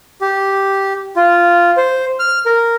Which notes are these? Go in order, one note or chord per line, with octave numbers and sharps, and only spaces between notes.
G4
F4
C5
F6
A#4